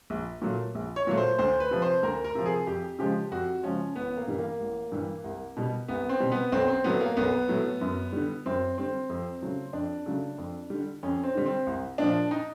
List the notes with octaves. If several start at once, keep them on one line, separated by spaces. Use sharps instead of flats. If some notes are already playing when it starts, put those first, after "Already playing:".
A#1
A#2 F#3 A3
A#1
C#5
A#2 F#3 A3
C5
D2 C5
B4
C3 F3
C5
D2 A#4
A#4
C3 F3
G#4
F2 G4
C#3 F3 G#3 G4
F2 F#4
C#3 F3 G#3 C#4
A1 B3
A#3
G2 E3 G3
A#3
A1
G2 E3 G3
C2
B2 G3
C2 B3
C4
B2 G3
B3
B1 C4
C4
A2 F#3 A3 B3
A#3
B1 B3
A2 F#3 A3
F#2
D3 G3
F#2 C4
D3 G3 C4
F2
C#3 F#3 A3
F2 D4
C#3 F#3 A3
F2
D3 G3
F2 C#4
C4
D3 G3
C4
C2
A#2 F3 D4
D#4